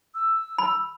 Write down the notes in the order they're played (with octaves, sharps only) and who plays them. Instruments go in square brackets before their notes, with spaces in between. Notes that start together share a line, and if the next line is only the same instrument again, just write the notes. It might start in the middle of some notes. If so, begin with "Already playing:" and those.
[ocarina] E6
[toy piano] B5